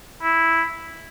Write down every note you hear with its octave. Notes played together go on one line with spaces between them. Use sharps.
E4